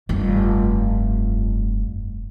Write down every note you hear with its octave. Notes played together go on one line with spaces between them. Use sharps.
F1 G2